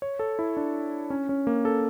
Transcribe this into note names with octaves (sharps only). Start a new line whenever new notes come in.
C#5
A4
E4
D4
C#4
C#4
A#3
A4